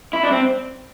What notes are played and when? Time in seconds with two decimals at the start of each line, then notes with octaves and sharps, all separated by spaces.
0.13 E4
0.23 D4
0.31 C4